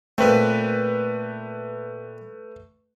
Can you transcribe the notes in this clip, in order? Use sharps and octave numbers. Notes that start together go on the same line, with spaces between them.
A#2 A3 C4 B4